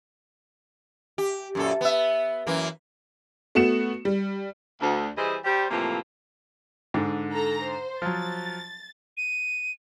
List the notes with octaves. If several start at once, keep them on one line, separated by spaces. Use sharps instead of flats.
G4
F#2 A#2 A4
B3 E5
F#2 E3 A#3
A3 B3 F#4 C#7 E7
G3
D2
E3 G3 E4 G#4 C5 D#5
G3 G4 C5
A2 C3 E3 F3 A3 A#3
G#2 D3
A4 A#5
C5
F3 F#3 A6
D#7